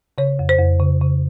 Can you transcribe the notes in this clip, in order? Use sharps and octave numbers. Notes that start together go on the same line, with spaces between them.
C#3 C#5
F2
C5
F2
C#3
C#3